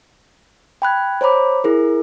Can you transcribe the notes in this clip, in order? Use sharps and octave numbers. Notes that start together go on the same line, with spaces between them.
G5 B5 F#6 G#6
C5 C#5 A#5 B5 D6
E4 G#4 A#4